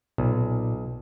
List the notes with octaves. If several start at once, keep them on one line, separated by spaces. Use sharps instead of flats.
B1 A#2